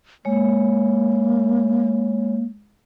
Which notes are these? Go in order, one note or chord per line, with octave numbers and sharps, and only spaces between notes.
G#3 A#3 C#5